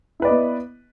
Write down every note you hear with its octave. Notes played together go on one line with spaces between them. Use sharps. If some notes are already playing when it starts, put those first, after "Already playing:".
B3 E4 B4 D5 D#5